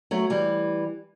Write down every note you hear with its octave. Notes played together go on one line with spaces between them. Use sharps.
F#3 A3
E3 G3